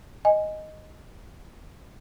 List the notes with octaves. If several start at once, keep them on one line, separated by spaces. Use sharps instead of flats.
D#5 G#5